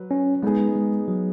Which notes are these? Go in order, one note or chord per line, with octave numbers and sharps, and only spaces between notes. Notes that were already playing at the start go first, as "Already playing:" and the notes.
Already playing: F#3 B4
C#4
G#3 B3 D#4 G#4
G#3
F#3